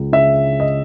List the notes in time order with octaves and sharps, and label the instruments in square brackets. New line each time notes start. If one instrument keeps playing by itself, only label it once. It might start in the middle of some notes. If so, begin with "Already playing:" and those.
Already playing: [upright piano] C#2
C#3 E5
D#5